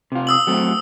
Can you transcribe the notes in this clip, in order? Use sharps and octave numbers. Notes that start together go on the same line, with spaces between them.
C3 F4
D#6 E6 F#7
F#3 A3 C4